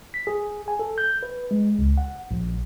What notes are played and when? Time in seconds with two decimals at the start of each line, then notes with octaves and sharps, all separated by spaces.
0.14 B6
0.27 G#4
0.68 G#5
0.79 A4
0.98 G6
1.23 B4
1.51 G#3
1.79 C#2
1.98 F#5
2.31 A#1